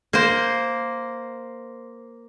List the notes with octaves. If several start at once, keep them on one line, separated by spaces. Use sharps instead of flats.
A#3 C5